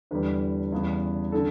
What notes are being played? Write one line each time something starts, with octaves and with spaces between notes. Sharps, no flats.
E2 D3 G3 B4
E2 C#3 G3 B3
D3 A4